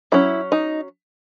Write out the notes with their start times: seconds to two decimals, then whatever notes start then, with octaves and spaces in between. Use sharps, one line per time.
0.12 F#3 C#4 E4
0.52 D#4